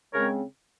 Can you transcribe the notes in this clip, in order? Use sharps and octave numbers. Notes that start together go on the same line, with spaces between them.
C#3 G#3 C4 A#4 C#5